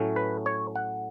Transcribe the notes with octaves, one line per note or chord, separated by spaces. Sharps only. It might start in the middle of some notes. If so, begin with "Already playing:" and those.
Already playing: A2 F#3 A3 C#4
B4
C#5
F#5